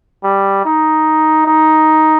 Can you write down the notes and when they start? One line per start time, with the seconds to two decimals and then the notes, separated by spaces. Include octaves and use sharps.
0.24 G3
0.65 D#4
1.46 D#4